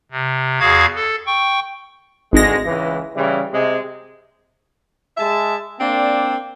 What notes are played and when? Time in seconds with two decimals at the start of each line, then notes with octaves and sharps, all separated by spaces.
0.12 C3
0.60 E2 F#4 G#4 F5 G#6
0.95 A4
1.26 G5 C#6
2.33 G#1 D2 G#3 A#6
2.65 C#2 E3
3.15 C#3 E3 G3
3.52 C3 G#3
5.17 G#3 E5 A5
5.79 A#3 C4 D4 D5